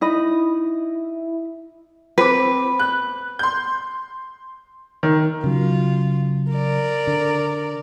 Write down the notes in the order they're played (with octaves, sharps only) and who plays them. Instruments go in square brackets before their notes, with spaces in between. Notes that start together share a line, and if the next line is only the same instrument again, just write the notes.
[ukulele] D#4 D#5 B5 [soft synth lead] E4
[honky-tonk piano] C4 D6 [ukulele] B4
[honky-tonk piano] F#6
C6 G6
[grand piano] D#3
[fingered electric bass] C#3 F#3 [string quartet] F4
[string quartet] A#4 D5
[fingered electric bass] D3